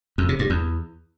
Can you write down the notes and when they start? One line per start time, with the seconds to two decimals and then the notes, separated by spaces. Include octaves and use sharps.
0.18 F2
0.29 C3
0.39 G2
0.50 E2